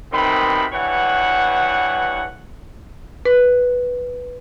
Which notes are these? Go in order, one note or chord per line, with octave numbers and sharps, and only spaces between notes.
F#2 C3 D#3 B3 C4 B5
G2 E3 C#5 F#5
B4